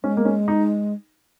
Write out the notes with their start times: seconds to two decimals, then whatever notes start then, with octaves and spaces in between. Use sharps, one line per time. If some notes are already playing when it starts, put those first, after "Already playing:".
0.04 G#3 C#4
0.17 A#3
0.25 C#4
0.48 D#4